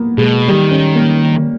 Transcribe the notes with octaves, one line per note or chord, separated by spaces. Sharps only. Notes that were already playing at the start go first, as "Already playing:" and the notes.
Already playing: A#3 B3
B2 G#3
D#3 G3
C#4
A#3